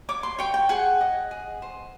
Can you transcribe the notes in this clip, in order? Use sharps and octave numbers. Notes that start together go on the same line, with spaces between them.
C#5 D6
C6
C#5 G5
G5
G#4 F#5
D#5
G#4
C5